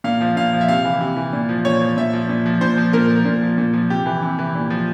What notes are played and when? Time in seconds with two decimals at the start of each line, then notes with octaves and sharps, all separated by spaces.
0.04 A#2 F5
0.21 F3
0.36 A#2 F5
0.53 F3
0.61 E5
0.68 C3 F5
0.84 E3
1.00 C3
1.17 E3
1.33 A#2
1.49 F3
1.65 A#2 C#5
1.81 F3
1.97 A#2 E5
2.13 F3
2.29 A#2
2.46 F3
2.61 A#2 C5
2.77 F3
2.93 A#2 A#4
3.09 F3
3.25 A#2
3.42 F3
3.58 A#2
3.73 F3
3.90 C3 G4
4.06 E3
4.22 C3
4.39 E3
4.55 A#2
4.70 F3